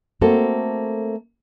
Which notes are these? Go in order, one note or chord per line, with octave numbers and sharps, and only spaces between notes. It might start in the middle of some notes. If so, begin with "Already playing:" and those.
A3 A#3 C4 F#4 A4 C5